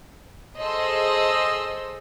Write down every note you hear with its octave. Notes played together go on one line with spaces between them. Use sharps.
G#4 A4 C5 D#5 C6 E6